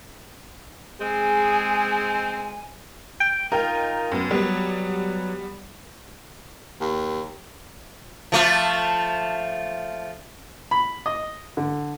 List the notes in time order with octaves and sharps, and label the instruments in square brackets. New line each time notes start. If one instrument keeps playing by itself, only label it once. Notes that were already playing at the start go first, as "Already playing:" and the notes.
[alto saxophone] G#3 [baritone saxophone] C4 [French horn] G#4 [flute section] G#5
[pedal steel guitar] G5
[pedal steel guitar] D#4 F4 [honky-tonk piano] A#4 G5
[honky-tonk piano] F#2 B3
[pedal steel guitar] F#3 [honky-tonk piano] G3 B3
[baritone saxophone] D#2
[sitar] F3 A3 F4
[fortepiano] B5
D#5
D3